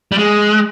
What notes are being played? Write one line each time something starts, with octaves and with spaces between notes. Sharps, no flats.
G3
G#3